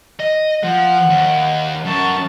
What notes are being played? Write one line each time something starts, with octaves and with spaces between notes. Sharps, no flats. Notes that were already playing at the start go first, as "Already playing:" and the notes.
D#5
F3 F#5
D#2
F#2 A5 C#6